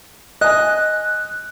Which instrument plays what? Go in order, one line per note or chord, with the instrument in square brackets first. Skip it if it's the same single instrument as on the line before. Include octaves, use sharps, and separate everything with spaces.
[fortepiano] D#5 G#5 [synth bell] F#6